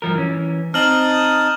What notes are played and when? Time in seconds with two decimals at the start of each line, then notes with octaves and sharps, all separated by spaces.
0.02 G2 F3 A#4
0.15 E3 C#4
0.74 C4 D#4 A5 D#6 F6 F#7